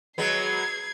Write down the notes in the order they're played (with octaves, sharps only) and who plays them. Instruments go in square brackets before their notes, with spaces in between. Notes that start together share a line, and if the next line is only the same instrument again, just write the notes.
[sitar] F#3 G#3 B3 [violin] G#6 C7